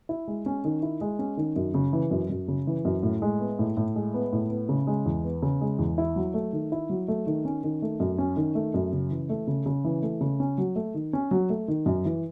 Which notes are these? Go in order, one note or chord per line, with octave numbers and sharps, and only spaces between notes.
E4
G#3
C#4
D#3
E4
G#3
C#4
D#3
F#2
C#3
E3
F#2
F#2
C#3
E3
F#2
A2
G#3
B3
A2
A2
G#3
B3
A2
B3
C#3
G#3
E2
B3
C#3
G#3
E2
E4
F#3
A3
D#3
E4
F#3
A3
D#3
C#4
D#3
A3
F#2
C#4
D#3
A3
F#2
C#3
E3
A3
C#3
C#3
E3
A3
C#3
C#4
F#3
A3
D#3
C#4
F#3
A3
D#3
F#2
E3